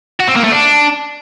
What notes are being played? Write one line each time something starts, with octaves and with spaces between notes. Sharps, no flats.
F#4
C4
A#3
A3
D4